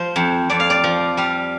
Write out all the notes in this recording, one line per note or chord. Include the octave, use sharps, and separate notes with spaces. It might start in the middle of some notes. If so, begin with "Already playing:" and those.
Already playing: F3 C5
F2
F2 D5
F5
D5
F3
G3 F5